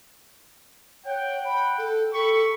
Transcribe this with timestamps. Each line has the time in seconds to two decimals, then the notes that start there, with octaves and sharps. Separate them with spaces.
1.05 C#5 F#5 G5
1.45 B5
1.78 A4
2.13 G4 A4 B5 C#6